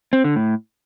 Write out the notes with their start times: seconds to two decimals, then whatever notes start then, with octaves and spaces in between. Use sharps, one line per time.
0.13 C4
0.24 D3
0.36 A2